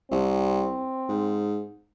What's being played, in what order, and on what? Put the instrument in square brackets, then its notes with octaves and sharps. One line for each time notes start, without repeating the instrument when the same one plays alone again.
[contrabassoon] C2 [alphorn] C4
[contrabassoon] G#2